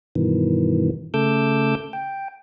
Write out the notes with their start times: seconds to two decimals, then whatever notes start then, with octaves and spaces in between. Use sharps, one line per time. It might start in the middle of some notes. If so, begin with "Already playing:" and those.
0.15 G2 B2 D#3 E3
1.14 C#3 A3 A4 D6 E6 G6
1.93 G5